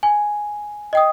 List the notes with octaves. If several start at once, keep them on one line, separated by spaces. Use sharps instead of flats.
G#5
D#5 G5 D#6